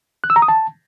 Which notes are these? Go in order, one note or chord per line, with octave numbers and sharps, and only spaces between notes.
F#6
E6
A#5
D#6
A5